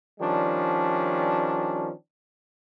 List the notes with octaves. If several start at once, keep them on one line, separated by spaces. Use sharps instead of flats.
D#3 F3 G3 C#4 D4